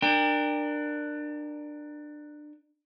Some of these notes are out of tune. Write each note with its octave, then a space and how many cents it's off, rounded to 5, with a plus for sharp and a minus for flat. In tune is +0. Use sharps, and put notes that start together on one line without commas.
D4 +20 A#4 -5 G5 +25